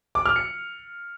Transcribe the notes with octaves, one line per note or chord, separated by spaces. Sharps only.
D6
F6
C#7